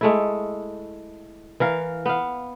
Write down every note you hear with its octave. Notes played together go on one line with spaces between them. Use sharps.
G#3 A3 E4
E3 A#4 F5
B3 F5